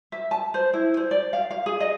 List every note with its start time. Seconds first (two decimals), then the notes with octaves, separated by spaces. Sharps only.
0.12 E5
0.31 A5
0.54 C5
0.74 E4
0.97 C5
1.11 D5
1.33 F5
1.51 F5
1.66 G#4
1.80 D#5